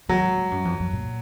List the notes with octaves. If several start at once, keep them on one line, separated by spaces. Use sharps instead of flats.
D#3 F#3
G#2
G#2
F#2
F2
F#2
A#2